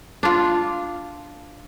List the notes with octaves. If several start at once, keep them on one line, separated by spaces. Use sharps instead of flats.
D4 F4